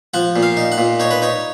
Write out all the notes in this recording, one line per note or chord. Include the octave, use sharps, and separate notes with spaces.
F3 F#5
A#2
F5
D#4
F#5
A#2
D#4 C#5
B4
D#4 C#5